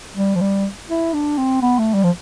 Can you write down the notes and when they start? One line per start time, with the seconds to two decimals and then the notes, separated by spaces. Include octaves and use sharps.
0.16 G3
0.35 F3
0.41 G3
0.89 E4
1.14 D4
1.38 C4
1.62 B3
1.79 A3
1.94 G3
2.04 F3